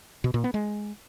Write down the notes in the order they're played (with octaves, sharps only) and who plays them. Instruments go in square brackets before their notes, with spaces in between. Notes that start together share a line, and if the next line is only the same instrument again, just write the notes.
[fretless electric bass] B2
A#2
B3
G#3